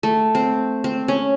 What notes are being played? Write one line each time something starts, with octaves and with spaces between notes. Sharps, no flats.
A3
C4
C4
C#4